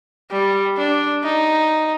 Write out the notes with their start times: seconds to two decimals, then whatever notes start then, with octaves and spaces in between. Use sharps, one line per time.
0.31 G3
0.77 D4
1.24 D#4